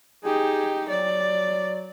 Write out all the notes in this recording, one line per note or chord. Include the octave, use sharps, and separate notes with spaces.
D#4 G4 G#4
F#3 D5